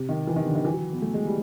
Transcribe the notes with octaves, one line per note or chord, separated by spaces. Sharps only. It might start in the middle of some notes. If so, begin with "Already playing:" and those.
Already playing: C3
D#3
E3
D#3
D3
D#3
E3
F#3
B3
A3
G#3
G3